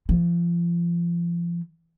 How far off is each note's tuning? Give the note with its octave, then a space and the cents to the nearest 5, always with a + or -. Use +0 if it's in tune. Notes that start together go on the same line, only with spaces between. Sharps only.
F3 -30